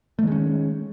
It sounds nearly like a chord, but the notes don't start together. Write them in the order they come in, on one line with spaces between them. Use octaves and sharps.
A3 D#3 G#3 C#4